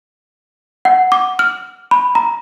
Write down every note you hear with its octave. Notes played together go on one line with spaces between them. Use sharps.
F#5
D6
F6
B5
A#5